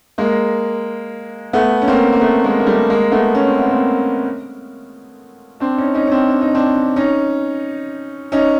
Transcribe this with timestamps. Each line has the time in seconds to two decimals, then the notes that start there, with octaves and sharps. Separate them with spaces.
0.18 G#3 A#3
1.53 A3 B3
1.82 C#4
1.88 A#3 C4
2.12 A#3
2.21 A3 B3
2.44 G#3 A#3
2.60 A#3
2.66 G3 A3
2.89 G#3 A#3
3.12 A3 B3
3.35 C#4
3.47 C4
3.59 B3
3.71 A#3 C4
5.60 C4 D4
5.77 C#4 D#4
5.95 C#4 D#4
6.07 C#4
6.11 C4 D4
6.29 D4
6.41 D#4
6.55 C4 D4
6.96 C#4 D#4
8.32 C#4 D#4